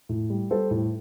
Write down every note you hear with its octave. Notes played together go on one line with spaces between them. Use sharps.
A2
G3
G3 A4 C5
A2